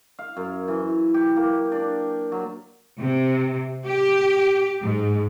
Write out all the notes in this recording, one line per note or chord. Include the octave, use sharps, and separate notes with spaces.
F5
F#2
E3
G4
A#3
D4
F#3
C3
G4
G#2